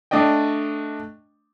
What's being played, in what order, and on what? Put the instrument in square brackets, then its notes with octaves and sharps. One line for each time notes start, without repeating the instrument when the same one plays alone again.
[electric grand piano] A3 D4 D5 D#5 G5